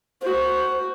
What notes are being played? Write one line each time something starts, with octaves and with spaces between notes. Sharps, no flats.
F#4 C5